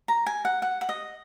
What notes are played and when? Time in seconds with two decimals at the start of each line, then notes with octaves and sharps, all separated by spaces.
0.08 A#5
0.26 G#5
0.45 F#5
0.62 F#5
0.81 F#5
0.89 D#5